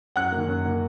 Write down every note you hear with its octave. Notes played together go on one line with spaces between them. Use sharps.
F#2 F#5 F#6
D#3 A#3
F#2
D#3 A#3